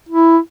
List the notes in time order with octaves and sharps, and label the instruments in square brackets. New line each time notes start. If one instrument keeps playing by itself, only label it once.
[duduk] E4